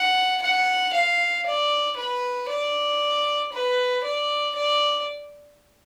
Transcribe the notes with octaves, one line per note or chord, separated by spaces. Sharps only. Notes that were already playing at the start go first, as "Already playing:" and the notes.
Already playing: F#5
F#5
F5
D5
B4
D5
B4
D5
D5